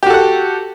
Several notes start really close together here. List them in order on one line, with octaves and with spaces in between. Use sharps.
G4 F#4 A4 F#5